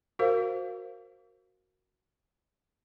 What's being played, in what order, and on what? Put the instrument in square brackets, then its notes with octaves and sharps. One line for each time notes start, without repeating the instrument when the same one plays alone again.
[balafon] F#4 A#4 C5 F5